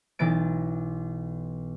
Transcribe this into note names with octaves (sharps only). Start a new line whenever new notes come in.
B1 E3 B3 A6 D7